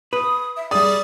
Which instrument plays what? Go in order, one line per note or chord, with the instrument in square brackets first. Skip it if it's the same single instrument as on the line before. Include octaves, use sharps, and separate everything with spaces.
[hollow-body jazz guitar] B4 [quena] D#6
[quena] E5
[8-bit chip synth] G3 D5 [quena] G#4 [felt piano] D#6